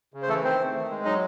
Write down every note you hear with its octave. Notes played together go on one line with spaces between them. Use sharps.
C#3
C5
E3 A3 A4
D#3 C4 C5
A3
D#3
G#3
F#3 D#4 D#5